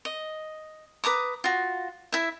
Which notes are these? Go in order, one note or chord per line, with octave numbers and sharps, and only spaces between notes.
D#5
B4 A#5 D6 D#6
F4 F#4
E4 E5